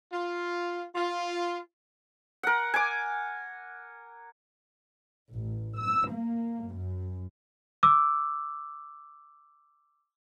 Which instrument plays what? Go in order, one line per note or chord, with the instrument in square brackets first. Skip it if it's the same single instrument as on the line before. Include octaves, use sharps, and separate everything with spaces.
[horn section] F4
F4
[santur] A#4 F#5
G#5 D6
[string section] A1
E6
A#3
F#2
[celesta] D6 E6